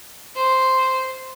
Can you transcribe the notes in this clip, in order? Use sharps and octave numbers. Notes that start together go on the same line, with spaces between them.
C5